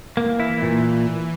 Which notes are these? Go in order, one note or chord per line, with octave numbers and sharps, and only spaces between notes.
E3 A#3
E4
A#2